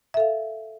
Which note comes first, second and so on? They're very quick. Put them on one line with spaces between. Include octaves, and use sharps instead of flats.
E5 A4 F5